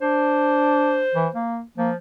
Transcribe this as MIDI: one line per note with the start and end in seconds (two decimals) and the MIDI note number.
0.01 1.04 62
0.01 1.41 72
1.14 1.27 52
1.34 1.62 58
1.77 1.96 53
1.77 1.90 58